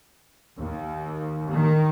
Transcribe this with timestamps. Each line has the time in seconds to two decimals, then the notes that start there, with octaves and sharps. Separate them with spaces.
0.59 D#2
1.50 D#3